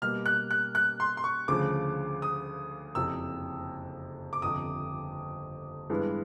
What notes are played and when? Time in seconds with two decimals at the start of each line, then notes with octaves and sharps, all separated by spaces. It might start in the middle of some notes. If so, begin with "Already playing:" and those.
0.02 B2 G3 A#3 F6
0.26 F#6
0.51 F#6
0.75 F#6
1.00 C6
1.17 C6
1.24 C#6
1.48 D2 C#3 F3 D6
2.22 D#6
2.95 F#1 F2 C3 E6
4.33 D6
4.42 G1 F2 C3 D#6
5.90 G2 E3 G#3 B3